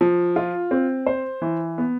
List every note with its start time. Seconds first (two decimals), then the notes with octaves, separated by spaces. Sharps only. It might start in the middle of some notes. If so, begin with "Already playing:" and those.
0.01 F3
0.36 F4
0.71 C4
1.06 C5
1.42 E3
1.78 B3